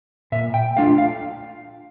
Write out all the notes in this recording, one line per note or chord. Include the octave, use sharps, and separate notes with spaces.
A#2 E5
G5
A3 D4 F4 F5
F5